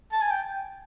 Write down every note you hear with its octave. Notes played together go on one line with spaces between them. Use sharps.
A5
G#5
G5